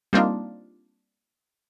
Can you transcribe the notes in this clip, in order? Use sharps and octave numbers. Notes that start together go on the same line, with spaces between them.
G3 A#3 C4 D4 D#4 F4